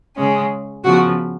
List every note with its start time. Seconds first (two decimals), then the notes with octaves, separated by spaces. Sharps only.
0.17 C#3 G#3 C#4
0.84 C#3 F3 B3 F#4